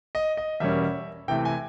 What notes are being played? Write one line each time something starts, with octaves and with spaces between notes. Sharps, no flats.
D#5
D#5
E2 B2 G3 A#3 C#4 E5
C3 E3 A3 G5
G#5